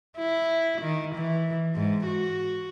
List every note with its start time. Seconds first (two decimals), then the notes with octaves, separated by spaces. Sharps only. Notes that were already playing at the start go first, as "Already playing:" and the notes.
0.18 E4
0.82 D#3
1.15 E3
1.75 G#2
2.06 F#4